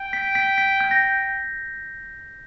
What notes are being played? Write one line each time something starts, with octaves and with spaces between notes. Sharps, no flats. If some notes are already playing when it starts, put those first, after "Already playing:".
Already playing: G5
B6
B6
B6
G6
A#6